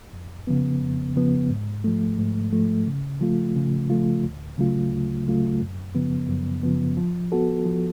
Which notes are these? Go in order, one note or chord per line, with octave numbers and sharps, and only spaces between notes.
F2
C#3 F3 B3
F2
C#3 F3 B3
G#2
F3 A3
G#2
F3 A3
C#3
F3 A3 F4
C#3
F3 A3 F4
D2
C#3 F#3 A3 F4
D2
C#3 F#3 A3 F4
F#2
C#3 F3 B3
F#2
C#3 F3 B3
F3
B3 F#4 A4
F3